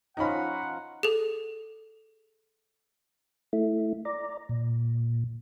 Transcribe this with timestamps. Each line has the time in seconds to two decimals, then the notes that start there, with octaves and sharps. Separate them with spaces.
0.17 D#3 F3 C#4 D#5 F#5 A#5 B5
1.03 G#4 A4
3.53 A3 E4
4.05 D5 A#5
4.49 A#2